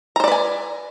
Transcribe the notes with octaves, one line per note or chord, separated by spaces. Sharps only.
B4 C5 D5 G#5 A#5